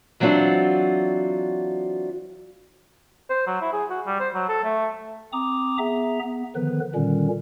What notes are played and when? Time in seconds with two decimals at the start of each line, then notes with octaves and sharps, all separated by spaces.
0.20 E3 F#3 C4 D4 F4 F#4
3.30 C5
3.47 F#3
3.61 E4
3.73 G#4
3.90 F#4
4.06 G3
4.20 C5
4.34 F#3
4.49 A4
4.64 A3
5.33 C4 A#5 D6 D#6
5.78 B3 G#4 E5 A#5
6.23 B3
6.55 D3 D#3 F3 B3 B4
6.95 A#2 D3 D#3 G3 C#4